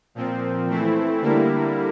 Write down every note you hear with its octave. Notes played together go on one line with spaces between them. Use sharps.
A#2 F3 C4
E3 A3 C4 E4
D3 G3 A#3 E4